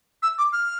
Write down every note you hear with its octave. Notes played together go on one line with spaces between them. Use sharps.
E6
D6
F6